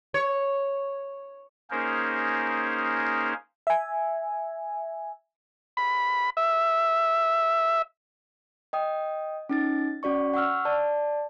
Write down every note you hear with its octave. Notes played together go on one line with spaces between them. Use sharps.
C#5
A#3 C#4 D#4 G#4 A#4 C5
E5 G#5
B5
E5
D#5 G5 D#6
C#4 D#4 A6
C#4 F#4 D5 C#6
F#5 C#6 E6 F6
D5 A5